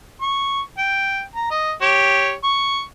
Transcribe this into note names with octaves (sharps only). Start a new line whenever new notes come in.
C#6
G5
A#5
D#5
G4 C#5
C#6